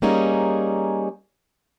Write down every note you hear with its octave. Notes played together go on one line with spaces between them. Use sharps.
G3 A#3 C#4 D#4 G#4